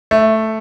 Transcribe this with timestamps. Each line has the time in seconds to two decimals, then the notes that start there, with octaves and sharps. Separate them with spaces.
0.11 A3